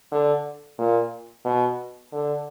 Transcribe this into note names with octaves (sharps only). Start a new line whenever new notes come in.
D3
A#2
B2
D3